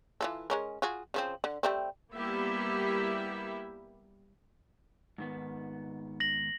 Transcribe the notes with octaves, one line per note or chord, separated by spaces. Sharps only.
E3 F4 A4
G#3 C#4 A#4
F4 F#4 G#4
C#3 F3 C4
D3
G3 A3 C4
G3 A#3 B3 E4 G4 E5
G#2 D#3 B3
A#6 F#7